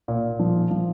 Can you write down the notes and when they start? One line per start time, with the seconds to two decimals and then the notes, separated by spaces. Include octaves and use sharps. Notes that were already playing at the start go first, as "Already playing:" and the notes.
0.08 A#2
0.39 F3
0.71 F3